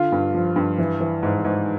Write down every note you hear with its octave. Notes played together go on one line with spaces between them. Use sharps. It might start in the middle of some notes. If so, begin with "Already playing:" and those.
Already playing: D3 F4
G2
F3
G2
E3
E3
G#2
G#2